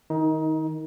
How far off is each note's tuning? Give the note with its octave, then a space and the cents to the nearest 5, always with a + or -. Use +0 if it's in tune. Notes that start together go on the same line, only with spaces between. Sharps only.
D#3 +0 D#4 +25